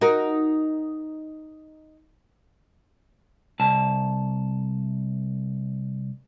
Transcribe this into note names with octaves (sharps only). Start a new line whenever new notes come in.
D#4 F#4 A#4
C2 A5